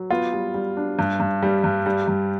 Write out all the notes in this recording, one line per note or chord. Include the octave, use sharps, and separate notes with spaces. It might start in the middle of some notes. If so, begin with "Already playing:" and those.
Already playing: F#3
B3 F4
G3
G3
D4
G2
G2
G3
G2
G3
G2